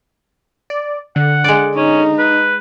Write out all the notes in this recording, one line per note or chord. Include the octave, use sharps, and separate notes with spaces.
D5
D3 F#5
G#3 D5
C#4 D#4
B4